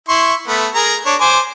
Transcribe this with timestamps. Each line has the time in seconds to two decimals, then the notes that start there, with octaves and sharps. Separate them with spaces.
0.08 E4 C6 C#6
0.48 A3 B3
0.75 G#4 A#4 A#5
1.06 D4 C#5
1.21 C5 G#5 D6